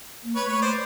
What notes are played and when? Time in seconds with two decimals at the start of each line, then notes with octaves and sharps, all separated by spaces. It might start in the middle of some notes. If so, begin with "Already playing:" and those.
0.24 A#3
0.35 A3 B4 C#5
0.48 B4 C#5
0.62 C5 D5